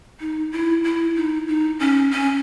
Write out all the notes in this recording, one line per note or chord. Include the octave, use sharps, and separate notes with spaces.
D#4
E4
E4
D#4
D#4
C#4
C#4